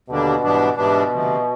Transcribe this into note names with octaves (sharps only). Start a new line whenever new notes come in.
D#2 B2 D3 G3 A#3 D4
G#2 E3 G3 B3 D4
G#2 B2 E3 G3 B3 D4
D2 C3 F3